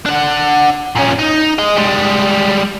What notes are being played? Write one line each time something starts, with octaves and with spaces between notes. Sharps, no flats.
D4 F#5
A#2 C#4
D#4
G#4 D#5
G3 G#3